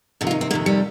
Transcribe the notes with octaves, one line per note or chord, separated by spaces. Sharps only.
F2 C3 D#3
F4
D#4
C4
F2 C3 D#3 A#3
G3